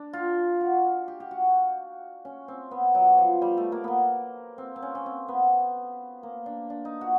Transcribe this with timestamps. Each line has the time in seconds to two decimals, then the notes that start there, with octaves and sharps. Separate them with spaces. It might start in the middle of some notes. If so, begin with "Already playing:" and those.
Already playing: D4
0.13 F4
0.61 F#4
1.08 G4
1.20 G4
1.31 F#4
2.25 C#4
2.48 C4
2.71 B3
2.95 F#3
3.18 F3
3.42 G3
3.57 A3
3.72 A#3
3.84 A#3 B3
4.58 C4
4.76 C4
4.82 C#4
4.95 C#4
5.06 C4
5.28 B3
6.23 A#3
6.46 D4
6.70 D4
6.85 D#4
7.01 F#4